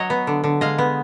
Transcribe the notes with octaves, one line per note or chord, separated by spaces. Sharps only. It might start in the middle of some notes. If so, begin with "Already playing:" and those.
Already playing: F#3 C#5 D#5
B3
D3
D3
G#3 D#5 F5
B3